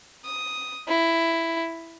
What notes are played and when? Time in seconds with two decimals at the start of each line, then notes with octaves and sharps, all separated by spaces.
0.25 D#6
0.88 E4